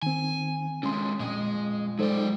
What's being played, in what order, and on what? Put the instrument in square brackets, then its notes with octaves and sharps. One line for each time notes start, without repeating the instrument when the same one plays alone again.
[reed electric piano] D#3 C4 [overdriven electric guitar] G#5
[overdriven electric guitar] D3 G#3 [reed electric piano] C#4 C6
[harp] F2 D#6 [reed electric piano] A#2 [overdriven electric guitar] G#3
[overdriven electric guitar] F#3 D5 [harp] G#3 [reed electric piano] D#4 A4 C5